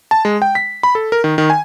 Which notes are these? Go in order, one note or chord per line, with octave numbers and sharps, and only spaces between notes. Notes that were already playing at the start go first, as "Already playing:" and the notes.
A5
G#3
G5
B6
B5
A4
A#4
D#3
D#3
G#5